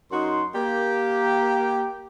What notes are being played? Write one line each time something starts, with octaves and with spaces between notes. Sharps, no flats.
F#2 D#4 F#4 C6
A#3 G4